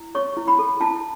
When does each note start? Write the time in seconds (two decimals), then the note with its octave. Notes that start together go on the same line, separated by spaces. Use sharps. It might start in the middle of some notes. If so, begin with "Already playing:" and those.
Already playing: E4
0.15 C#5 C#6
0.37 E4
0.48 B5
0.59 A4
0.80 E4 A5